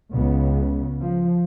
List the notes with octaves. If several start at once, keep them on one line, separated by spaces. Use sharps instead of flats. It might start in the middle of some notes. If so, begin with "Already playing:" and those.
C#2 C#3 B3
F3